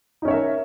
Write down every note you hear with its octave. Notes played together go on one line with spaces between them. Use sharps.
C#4 D#4 A#4 C#5 E5